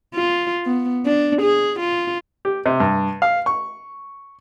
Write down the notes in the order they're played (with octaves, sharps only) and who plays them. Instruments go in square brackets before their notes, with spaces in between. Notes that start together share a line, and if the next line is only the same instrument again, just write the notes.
[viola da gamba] F4
B3
D4
G#4
F4
[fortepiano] G4
C3
G2
F5
C#6